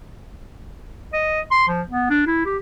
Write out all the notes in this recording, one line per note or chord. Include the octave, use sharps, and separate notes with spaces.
D#5
C6
F3
B3
D4
E4
G4